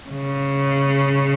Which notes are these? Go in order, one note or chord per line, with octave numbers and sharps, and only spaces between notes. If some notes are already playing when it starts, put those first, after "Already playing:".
C#3